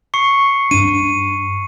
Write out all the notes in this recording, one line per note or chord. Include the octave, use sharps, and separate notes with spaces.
C#6 C7 C#7
G2 D4 D#7